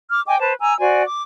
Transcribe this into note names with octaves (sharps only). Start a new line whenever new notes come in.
D6 F6
D#5 G5 G#5 D6
B4 C5 A5
G#5 A#5 E6
F#4 C5 D5 G#5
D6